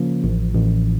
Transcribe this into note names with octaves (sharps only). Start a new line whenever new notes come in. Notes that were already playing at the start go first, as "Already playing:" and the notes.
Already playing: C#3 F3 A#3 C#4
A1
A1